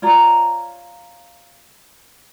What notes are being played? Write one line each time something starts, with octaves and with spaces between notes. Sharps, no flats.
F4 C#5 D5 A#5